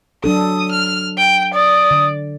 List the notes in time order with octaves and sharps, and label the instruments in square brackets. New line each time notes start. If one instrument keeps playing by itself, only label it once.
[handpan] F#3 D4 A4 [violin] D#6
[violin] F6
G5
[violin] D5 [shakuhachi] D#6
[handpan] D3